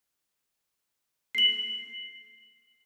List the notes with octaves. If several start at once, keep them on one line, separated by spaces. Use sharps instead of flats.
C7 F#7